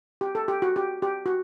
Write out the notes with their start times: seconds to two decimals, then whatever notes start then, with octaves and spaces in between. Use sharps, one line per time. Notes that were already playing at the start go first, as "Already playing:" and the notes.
0.21 G4
0.35 A4
0.48 G4
0.62 F#4
0.76 G4
1.02 G4
1.26 F#4